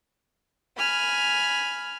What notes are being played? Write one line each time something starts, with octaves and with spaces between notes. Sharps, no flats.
G#5 B5 F6